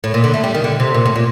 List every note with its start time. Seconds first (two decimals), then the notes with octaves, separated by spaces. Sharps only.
0.04 A2
0.14 A#2
0.24 D3
0.34 A3
0.44 G3
0.55 D#3
0.64 D3
0.80 C3
0.94 A#2
1.06 A2
1.16 A#2